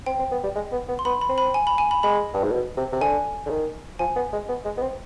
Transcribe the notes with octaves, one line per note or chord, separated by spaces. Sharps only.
C4 G5
C4
B3
G3
G#3
B3
B3
C6
B3 B5
B5
C4
B5
G#5
B5
G#5
B5
G#3 B5
G2
G#2
B2
C3
C3
D3 G#5
D3
D#3
F3 G#5
B3
G#3
B3
G#3
B3
C4